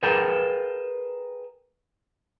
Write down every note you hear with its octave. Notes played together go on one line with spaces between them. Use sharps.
G#4 A#4 B4 F5 G5 A5